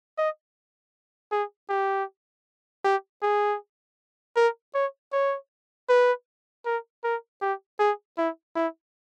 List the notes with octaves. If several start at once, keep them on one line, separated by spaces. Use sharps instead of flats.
D#5
G#4
G4
G4
G#4
A#4
C#5
C#5
B4
A#4
A#4
G4
G#4
E4
E4